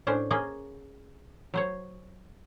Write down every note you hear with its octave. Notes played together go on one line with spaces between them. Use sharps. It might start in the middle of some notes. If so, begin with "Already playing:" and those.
A2 C#4 D4 C5
A#3 C#4 G#4 D#5
F#3 C5 C#5